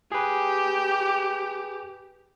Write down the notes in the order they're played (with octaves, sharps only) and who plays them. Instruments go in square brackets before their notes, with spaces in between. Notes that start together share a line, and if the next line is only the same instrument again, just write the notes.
[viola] G4 [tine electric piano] G#4 B4